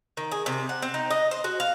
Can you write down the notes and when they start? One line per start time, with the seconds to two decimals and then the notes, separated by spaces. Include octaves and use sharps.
0.17 D#3
0.32 G#4
0.46 C3
0.69 F#5
0.82 C4
0.94 D#4
1.11 D#5
1.31 C5
1.44 F#4
1.60 F5